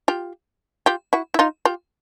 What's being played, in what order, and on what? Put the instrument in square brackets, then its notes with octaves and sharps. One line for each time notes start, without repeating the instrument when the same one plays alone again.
[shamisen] F4 G4
F4 G4
E4 F#4
E4
D#4 F4
F4 G4